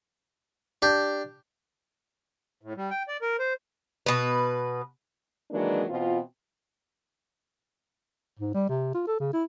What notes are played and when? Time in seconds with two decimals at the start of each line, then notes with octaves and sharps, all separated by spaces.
0.82 D4 G4
2.61 A2
2.77 G3
2.91 G5
3.08 D5
3.22 A#4
3.39 C5
4.06 B2 B4
5.51 D#3 E3 F#3 G#3 A#3 D4
5.88 B2 E3 C4 F4
8.39 G#2
8.54 G3
8.69 C3
8.95 F4
9.07 A4
9.20 C#3
9.33 E4